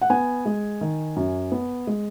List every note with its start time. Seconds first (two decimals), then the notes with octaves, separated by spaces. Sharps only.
0.01 F#5
0.10 B3 G#5
0.46 G#3
0.81 D#3
1.16 F#2
1.52 B3
1.87 G#3